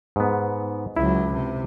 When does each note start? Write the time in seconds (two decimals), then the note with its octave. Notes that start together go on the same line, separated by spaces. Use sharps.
0.16 G#2 B3
0.97 C#2 F#3 E4 E5
1.33 C3